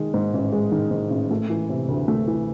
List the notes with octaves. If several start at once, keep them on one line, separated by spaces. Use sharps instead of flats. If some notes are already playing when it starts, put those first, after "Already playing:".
Already playing: D#3 G#3
G#2
A1
G#3
D#3
G#2
A1
A3
E3
C3
D2
A3
E3